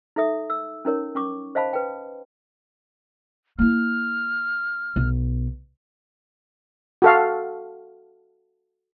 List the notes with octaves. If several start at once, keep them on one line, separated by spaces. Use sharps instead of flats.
D#4 A4 E5 D#6
E6
C#4 D#4 A#4 C#5
C#4 C#6 D6
C5 D#5 F5 A5 B5
B4 G5
A#3 E4 F6
B1
F#4 A4 F5